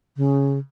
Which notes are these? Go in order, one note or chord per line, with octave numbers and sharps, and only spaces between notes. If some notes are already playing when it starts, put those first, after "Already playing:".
C#3